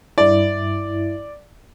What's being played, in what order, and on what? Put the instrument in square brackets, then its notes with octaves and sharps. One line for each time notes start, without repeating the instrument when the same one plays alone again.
[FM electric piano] G2 E4 [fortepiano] D5